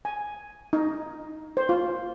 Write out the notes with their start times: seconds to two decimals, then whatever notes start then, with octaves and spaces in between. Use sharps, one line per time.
0.05 G#5
0.73 D#4
1.57 C5
1.69 F4